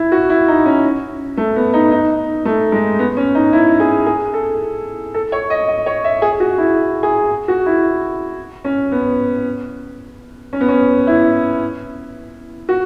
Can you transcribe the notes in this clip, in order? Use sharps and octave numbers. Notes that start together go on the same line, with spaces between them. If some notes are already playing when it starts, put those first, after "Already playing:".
Already playing: E4
F#4
E4
D#4
C#4
A3
B3
D#4
D#4
A3
G#3
B3
C#4
D#4
E4
G#4
G#4
A4
A4
C#5
D#5
D#5
C#5
E5
G#4
F#4
E4
G#4
F#4
E4
C#4
B3
C#4
B3
C#4
E4
F#4